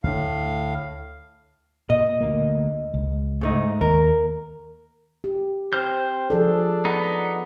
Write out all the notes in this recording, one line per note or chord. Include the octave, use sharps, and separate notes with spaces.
D2 A2 D4 F5
A#2 D#5
D2 A#3
C#2
G#2 A3 D#4
D#2 A#4
G4
C4 C5 F6 G6
F3 D4 G#4 A4
B3 D#4